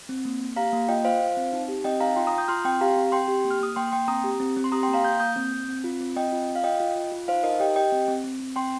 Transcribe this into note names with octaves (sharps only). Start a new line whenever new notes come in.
C4
A#3
A#3
G4 F5 A#5
A#3
F4 D#5 G5
F4 C5 F5
F4
C4
D#4
G4
C4 D#5 G5
D#4 F5 A#5
F4 G5 C6
A#5 D#6
F4
D#6 G6
F4 C6 F6
C4 G5 C6
G4 F5 A#5
C4
C4 G5 C6
G4
A#3
F6
A#3 D#6
A#3 G5 C6
A#3 G5 C6
C4 A#5 D#6
G4
C4
C4
C6
G4 A#5 D#6
G5 C6
A#3
F5 A#5
A#3 D#6 G6
A#3 D#6 G6
C4
C4
C4
F4
C4
C4 D#5 G5
F4
F4
F5
F4 D#5 G5
F4
F4
F4
D#4 C5 F5
D#4 A#4 D#5
G4 D#5 G5
G4 D#5 G5
C4
C4
C4
C4
C4 G5 C6